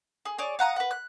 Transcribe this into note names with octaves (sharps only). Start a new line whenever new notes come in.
G#4
G#4 C#5 D5
F5 F#5 A#5 D#6
B4 F#5
F#6